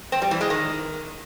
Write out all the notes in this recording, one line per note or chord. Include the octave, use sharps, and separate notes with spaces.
C4
G3
E3
G#3
D#3